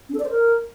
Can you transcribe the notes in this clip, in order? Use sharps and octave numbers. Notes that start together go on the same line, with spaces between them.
C#4
A4
D5
C5
A#4